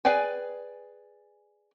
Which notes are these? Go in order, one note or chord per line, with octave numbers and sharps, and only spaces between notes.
G#4 B4 D5 G5 G#5